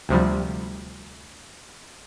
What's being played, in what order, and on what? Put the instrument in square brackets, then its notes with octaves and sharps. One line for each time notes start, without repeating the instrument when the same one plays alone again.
[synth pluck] D2 C3 F3 G3